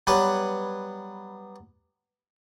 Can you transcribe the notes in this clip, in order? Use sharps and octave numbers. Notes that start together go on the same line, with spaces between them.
F#3 G3 B3 B4 C#5